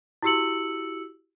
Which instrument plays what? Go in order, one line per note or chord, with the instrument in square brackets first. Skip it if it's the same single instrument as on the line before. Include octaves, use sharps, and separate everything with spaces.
[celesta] E4 F#4 G4 E6 C#7 F#7